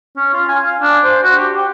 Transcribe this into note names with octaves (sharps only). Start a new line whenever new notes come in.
C#4
F4
G#5
F5
D4
C5
F#4
G4
G5